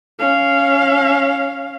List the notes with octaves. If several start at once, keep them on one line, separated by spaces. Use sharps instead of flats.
C#4 F5